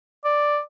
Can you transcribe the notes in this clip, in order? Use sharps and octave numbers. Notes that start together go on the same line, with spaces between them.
D5